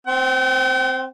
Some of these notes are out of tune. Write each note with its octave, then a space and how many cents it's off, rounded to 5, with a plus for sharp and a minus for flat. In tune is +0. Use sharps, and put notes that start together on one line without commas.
C4 +0 G5 -45